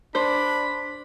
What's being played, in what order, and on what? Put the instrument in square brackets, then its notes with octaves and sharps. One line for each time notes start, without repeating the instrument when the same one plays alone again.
[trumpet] D4 [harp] C5 [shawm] B5